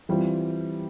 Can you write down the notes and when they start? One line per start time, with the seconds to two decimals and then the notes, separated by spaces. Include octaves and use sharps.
0.09 E3 G3 C4 F4